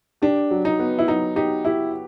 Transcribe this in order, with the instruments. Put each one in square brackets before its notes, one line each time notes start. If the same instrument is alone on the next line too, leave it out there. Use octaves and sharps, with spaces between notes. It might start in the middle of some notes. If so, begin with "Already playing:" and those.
[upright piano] D4 [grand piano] G4
[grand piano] F#3
[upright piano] D#4
[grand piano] B3
[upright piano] E4
[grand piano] F#3 [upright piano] D#4
[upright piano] D#4 [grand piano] G4
[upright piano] E4 [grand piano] G4